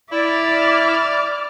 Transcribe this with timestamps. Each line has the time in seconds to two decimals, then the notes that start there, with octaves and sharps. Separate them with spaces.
0.12 E4 D5 E5 D6 F6